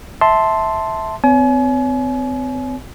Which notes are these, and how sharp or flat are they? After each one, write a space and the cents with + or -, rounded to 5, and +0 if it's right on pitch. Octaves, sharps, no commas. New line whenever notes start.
E5 -10 A5 +0 C6 +0
C4 -40 C#5 +35 G#5 +35